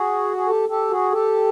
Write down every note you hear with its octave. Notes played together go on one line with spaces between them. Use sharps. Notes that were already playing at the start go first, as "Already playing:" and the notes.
Already playing: F#4 G#4
G#4
G4 A4
G4 A4
F#4 G#4
G4 A4